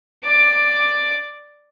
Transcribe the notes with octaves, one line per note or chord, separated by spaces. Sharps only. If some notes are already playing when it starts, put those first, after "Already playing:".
D5 D6